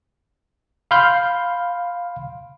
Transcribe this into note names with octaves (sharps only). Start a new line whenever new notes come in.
F5 B5 C6 F6 G6